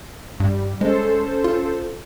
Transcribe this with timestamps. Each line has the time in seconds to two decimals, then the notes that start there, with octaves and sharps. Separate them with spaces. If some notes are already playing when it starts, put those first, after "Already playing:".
0.40 G2 G3
0.81 G#3 C#4 A4 C5
1.44 F4